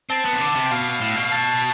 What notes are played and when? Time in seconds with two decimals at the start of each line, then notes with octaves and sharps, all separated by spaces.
0.10 C4 A5
0.25 B3
0.32 C3
0.41 D3
0.56 C3
0.65 G5
0.71 B2 F5
1.01 A2
1.16 B2
1.31 A5